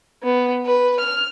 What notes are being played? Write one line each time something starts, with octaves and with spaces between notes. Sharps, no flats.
B3
B4
F6